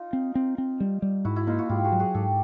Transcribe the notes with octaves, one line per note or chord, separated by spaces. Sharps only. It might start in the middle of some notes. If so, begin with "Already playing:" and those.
Already playing: D#4 F4
C4
C4
C4
G3
G3
G#2 E4 F#4
E4 F#4
A#3 D#4 F4
E4 F#4
G#2 F4 G4
F#4 G#4
F#3
F#4 G#4
G#2 G4 A4